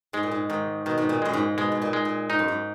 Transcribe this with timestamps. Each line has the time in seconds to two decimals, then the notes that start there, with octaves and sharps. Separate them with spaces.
0.13 G#2 G#3
0.23 A#2
0.31 G#2
0.50 G#2 D#3
0.86 B2 D#3
0.98 G#2
1.09 A#2
1.22 F#2 G#3
1.33 G#2
1.58 B2 G#3
1.72 G#2
1.82 A#2
1.93 G#3
2.05 A#2
2.30 G#2 D#4
2.39 F#2
2.48 G#2